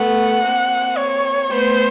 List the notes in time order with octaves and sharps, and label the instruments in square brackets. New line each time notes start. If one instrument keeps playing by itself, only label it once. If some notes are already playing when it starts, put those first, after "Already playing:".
Already playing: [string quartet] A3 B3 [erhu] F#5
[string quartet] A#3 C4
[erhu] C#5
[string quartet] A3 B3 [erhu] C5